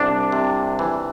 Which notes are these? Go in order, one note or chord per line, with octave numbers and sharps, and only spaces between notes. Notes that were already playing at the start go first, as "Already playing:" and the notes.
Already playing: C2 D4
C3
E3